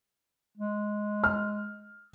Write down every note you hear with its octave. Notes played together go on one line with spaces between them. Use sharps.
G#3
F6